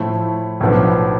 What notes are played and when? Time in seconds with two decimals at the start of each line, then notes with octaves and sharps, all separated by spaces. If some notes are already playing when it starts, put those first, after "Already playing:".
Already playing: A2 F3 A3 E4
0.60 B1 A2 F3 B3 D4